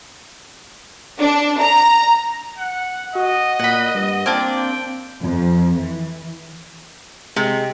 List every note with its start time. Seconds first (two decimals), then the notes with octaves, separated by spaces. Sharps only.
1.21 D4
1.60 A#5
2.58 F#5
3.15 F#4 D#5
3.59 A#2 F#5 B5
3.95 G2
4.26 A#3 C4 D4 F4
4.57 G5
5.22 F2
5.78 E3
7.36 C3 G#3